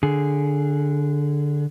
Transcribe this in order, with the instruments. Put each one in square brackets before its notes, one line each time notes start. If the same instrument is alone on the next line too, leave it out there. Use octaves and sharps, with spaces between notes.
[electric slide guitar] D3 G#4